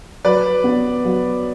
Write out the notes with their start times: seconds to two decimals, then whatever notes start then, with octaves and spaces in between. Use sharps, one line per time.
0.25 F#3 B4 D5
0.64 B3
1.04 F#3